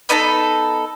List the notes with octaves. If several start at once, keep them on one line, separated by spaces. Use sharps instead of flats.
B3 D#4 A4 D#5